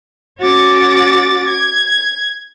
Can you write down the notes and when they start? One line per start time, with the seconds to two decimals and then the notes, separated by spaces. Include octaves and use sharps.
0.40 C#4 F#4 D6 A6 A#6
1.48 G#6